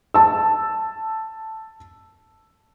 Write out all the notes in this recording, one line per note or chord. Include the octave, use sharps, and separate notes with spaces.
A5 E6